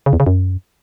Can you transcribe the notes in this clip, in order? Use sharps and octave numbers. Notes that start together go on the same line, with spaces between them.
C#3
E2
C#3
F#2